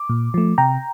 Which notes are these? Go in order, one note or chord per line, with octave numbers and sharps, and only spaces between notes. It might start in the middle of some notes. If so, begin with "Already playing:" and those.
Already playing: D6
A#2
F3 A3
C3 G5 A#5